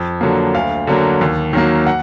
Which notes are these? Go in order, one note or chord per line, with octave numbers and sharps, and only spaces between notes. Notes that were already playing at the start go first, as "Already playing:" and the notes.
Already playing: F2
D3 F#3 A#3
D2 F5
D3 F#3 A#3
D#2
D#3 F#3 A#3
F#5